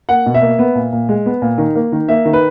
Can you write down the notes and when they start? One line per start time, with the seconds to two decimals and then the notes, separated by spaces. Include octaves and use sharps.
0.09 A#3 F#5
0.26 B2
0.34 E5
0.42 A#3
0.59 B3
0.75 A#2
0.92 A#2
1.09 G#3
1.26 B3
1.42 A#2
1.58 D#3
1.75 A#3
1.92 D#3
2.09 A#3 E5
2.25 D#3
2.33 B4